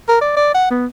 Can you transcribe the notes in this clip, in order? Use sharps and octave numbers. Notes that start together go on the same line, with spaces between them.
A#4
D5
D5
F#5
B3